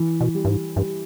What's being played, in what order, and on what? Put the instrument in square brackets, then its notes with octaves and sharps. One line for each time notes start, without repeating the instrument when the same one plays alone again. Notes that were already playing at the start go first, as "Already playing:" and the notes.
Already playing: [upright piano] E3
[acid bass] B2
[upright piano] G3
[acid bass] G2
G#2
[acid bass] G2 [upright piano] G3